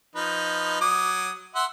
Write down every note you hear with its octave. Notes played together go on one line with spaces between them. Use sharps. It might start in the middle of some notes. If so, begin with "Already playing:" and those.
F3 D#4 B4
F#3 D6 D#6
E5 F#5 C6